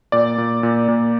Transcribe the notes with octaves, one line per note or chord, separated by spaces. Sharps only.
A#2 D5
A#2
A#2
A#2